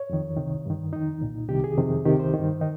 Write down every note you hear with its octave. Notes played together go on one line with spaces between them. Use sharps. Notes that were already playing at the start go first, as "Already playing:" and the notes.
Already playing: C#5
F2 D#3
C2 C3 D#3
G2 D#3
F2 D#3 D#4
C2 A#2
C2 C3 D#3 G4
G#4
F2 C3 D#3
C#2 C3 D#3 G4
C5
G2 D#3
D#3 D#4